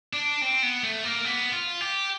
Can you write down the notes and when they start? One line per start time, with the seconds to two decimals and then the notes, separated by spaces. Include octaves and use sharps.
0.13 D4
0.42 C4
0.62 B3
0.83 A3
1.04 A#3
1.25 B3
1.53 F4
1.81 G4